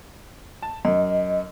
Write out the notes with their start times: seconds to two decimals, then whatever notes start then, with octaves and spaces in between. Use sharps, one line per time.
0.62 A5
0.85 F#2 D#5